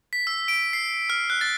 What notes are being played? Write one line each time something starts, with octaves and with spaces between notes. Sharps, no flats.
B6
E6
D7
C7
F6
F#6
A6